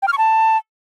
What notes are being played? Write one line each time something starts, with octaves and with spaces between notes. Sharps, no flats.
G5
F6
C#6
A5